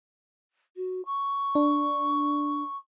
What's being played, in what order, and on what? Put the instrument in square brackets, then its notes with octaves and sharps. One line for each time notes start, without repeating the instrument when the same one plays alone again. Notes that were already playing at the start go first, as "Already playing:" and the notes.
[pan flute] F#4
C#6
[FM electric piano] D4